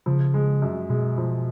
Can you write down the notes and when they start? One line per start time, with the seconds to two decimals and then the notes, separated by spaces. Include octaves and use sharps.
0.06 C#3 F3
0.34 G#3
0.62 F#2
0.89 B2 G#3
1.18 F3